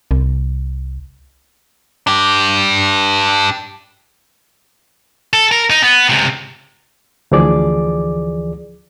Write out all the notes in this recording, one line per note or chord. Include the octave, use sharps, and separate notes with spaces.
C2
D4 G4
A4
A#4
D#4
B3
C#2 C3
D2 E3 F3 G#4 D5 D6